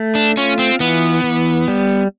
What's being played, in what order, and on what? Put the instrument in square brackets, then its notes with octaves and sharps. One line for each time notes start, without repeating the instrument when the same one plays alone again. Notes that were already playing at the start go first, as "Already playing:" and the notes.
Already playing: [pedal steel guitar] A3
[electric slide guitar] D4
[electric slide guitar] C#4 [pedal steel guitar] F4
[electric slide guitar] C4
[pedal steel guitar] E3 [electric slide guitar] B3
[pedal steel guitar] E3
G3